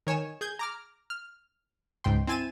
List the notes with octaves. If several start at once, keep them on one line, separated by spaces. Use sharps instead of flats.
D#3 C#5 G#5 E7
G#4 G6 G#6
A#5 D6 F6
F6
C#2 G#2 G5 C6
C4 E4 G#5 A6 D#7 E7